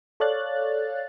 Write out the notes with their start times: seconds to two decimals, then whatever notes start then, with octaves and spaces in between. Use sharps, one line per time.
0.20 A4 C#5 D5 F5 F#6 A6